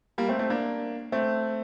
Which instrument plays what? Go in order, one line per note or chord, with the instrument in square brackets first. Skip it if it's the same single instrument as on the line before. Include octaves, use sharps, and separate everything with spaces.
[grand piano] G3 A#3
A3 C4
A3 C4
A#3 D4
A3 C4